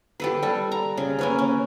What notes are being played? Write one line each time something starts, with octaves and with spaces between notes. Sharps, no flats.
G4 A4 B4
G3 A4
A#5
C#3
A#3 C#4 B4
C#4